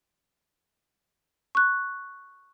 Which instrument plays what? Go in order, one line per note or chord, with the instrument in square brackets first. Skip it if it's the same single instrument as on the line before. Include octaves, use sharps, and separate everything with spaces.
[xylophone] C#6 F#6